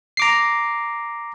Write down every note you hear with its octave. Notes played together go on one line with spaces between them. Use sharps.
A#5 D6 C7